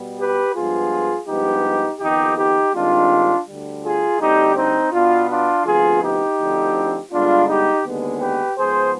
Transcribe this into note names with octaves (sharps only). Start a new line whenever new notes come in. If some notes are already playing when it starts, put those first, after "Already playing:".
Already playing: B2 G3 B3
G4 B4
G2 F3 G#3 B3 F4 G#4
G2 F3 G#3 B3 D#4 G4
F2 D#3 B3 D#4 G4
D#4 G4
G2 D#3 G#3 C4 D4 F4
D2 D3 G3
F4 G#4
D2 D3 G3 C4 D#4 G4
C4 D#4
B2 B3 D4 F4
D4 F4
D2 C3 F3 B3 F4 G#4
D#4 G4
D2 D3 F3 C4
G2 D3 G#3 B3 D4 F4
D#4 G4
D#2 D3 G#3 B3
G4 B4
G#2 F3 B3 G#4 C5